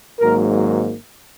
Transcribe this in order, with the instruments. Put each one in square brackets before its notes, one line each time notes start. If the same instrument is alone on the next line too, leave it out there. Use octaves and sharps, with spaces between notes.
[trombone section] G#1 G#2 F#3 A#3 A#4